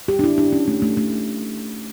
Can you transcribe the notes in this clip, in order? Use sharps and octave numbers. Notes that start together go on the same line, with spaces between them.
G4
D4
E4
D4
C#4
A3
A3
A3